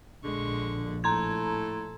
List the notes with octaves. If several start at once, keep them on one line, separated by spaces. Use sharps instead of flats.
A#1 D3 G#3 C#6
A2 A4 A#5 C6 G#6